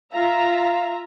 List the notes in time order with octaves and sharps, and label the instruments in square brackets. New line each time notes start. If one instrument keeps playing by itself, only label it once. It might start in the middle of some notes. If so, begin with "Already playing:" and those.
[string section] F4 E5 A#5 [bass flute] F5